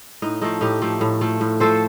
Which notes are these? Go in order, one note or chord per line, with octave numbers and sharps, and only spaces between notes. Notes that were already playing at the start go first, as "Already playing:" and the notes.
A2 D#4
F3 A3 D#4
A2 D#4 G4
F3 A3
A2
F3 A3
A2
F3 A3 A4 C5